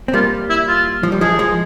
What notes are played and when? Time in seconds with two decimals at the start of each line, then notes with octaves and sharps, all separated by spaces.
0.08 C4
0.13 G3 A#3 F4
0.50 E4
0.68 F4
1.03 F3
1.12 G3
1.21 F3 G#3 G#4
1.39 F3 G#3